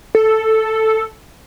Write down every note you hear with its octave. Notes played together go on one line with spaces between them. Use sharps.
A4